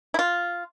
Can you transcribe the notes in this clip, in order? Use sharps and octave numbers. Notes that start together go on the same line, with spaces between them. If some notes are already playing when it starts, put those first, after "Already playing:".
E4
F4